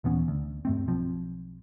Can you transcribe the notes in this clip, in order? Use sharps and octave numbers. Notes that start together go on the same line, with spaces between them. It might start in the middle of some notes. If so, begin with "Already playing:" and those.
D#1 E3 B3 C#4
D2
G2 A3 C4
B1 F3 C4